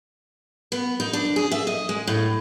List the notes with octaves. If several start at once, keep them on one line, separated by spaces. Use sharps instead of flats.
B3
D#4
D4
G#4
E5
D#5
G#3
A2